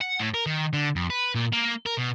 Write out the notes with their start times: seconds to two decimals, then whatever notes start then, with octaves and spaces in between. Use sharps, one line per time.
0.01 F#5
0.19 A2
0.34 A#4
0.46 D#3
0.73 D3
0.96 F2
1.10 B4
1.35 A#2
1.52 A#3
1.86 A#4
1.98 B2